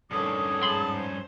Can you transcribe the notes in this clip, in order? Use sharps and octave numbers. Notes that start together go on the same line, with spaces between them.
G2 D3 D#3 C#4 D#6
G#2 G#4 A5 B5 C6
C5